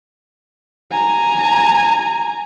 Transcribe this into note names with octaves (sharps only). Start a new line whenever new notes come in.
G#5 A#5